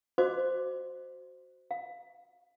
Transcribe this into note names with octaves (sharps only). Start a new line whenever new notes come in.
F#4 C5 D#5 F5 C6 D6
F5